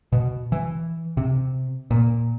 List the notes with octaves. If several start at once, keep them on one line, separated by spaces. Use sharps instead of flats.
B2
E3
C3
A#2